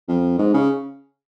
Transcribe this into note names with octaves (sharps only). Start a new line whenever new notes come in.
F2
G#2
C#3